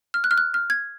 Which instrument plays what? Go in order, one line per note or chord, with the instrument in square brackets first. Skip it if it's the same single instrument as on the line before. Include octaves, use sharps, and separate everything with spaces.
[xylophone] F6
F#6
F6
F#6
F6
G#6